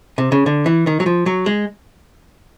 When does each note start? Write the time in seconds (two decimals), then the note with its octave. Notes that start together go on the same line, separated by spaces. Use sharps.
0.18 C3
0.32 C#3
0.46 D3
0.66 E3
0.87 D#3
1.00 F#3
1.06 F3
1.26 F#3
1.46 G#3